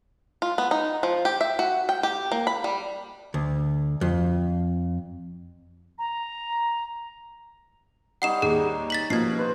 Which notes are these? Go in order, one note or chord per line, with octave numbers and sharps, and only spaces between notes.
F4
B3
D#4
F3
G4
E5
F#4
G5
G4
A#3
B5
G3
D2
F2
A#5
G3 D#4 C#5 F#5 C7 E7
D#2 G#4
A6 B6 F#7
B2 F3 A#3 G#6 C7
B4 C5